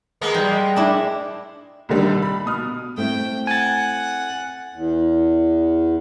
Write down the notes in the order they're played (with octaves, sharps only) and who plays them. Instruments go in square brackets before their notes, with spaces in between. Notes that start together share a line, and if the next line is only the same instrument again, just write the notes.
[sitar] G#3 A#3 B3
[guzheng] G3
D4 E4
[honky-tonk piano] C2 D3 D#3 G3
B5
B2 D#6 F6
[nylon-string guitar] A3 C4 E4 [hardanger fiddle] G5
[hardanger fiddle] F#5 [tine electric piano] G#5 A6
[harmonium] E2